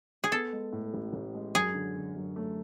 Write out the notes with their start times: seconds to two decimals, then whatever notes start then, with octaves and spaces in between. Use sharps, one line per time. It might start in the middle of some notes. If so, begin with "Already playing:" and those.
0.24 G#4
0.31 B3 A4
0.53 G#3
0.73 A2
0.94 A1
1.13 A1
1.35 G#3
1.55 F#2 G#4
1.74 D3
1.95 D3
2.16 F#2
2.36 A3